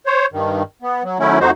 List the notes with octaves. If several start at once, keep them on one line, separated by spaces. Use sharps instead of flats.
C5 C#5
G2 D#3
B3
F#3
D#3 F#3 A3 C#4 E4
F2 A3 D#4 F#4 C5